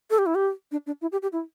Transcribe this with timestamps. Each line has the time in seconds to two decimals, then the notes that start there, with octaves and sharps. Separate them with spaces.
0.10 A4
0.18 G4
0.26 E4
0.35 G4
0.72 D4
0.87 D4
1.02 E4
1.12 G4
1.22 G4
1.33 E4